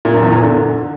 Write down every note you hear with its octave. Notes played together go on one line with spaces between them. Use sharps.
A#2
F#2
E2
A#2
D3